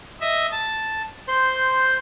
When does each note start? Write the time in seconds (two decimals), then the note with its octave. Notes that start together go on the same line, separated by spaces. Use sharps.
0.21 D#5 E5
0.52 A5
1.28 C5 C6 G6